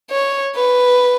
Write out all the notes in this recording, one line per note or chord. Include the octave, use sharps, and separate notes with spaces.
C#5
B4